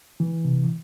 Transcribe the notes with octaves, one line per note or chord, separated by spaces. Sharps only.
E3
C3